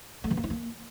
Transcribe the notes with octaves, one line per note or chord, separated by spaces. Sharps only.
A3
E3
A#3
E4
A#3